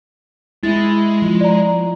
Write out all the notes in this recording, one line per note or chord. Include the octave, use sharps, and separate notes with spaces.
G#3 E4 A6
F3
D5 A#5